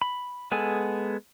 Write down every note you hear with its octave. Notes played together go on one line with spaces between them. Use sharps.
B5
G#3 B3 G#4 A4 G#5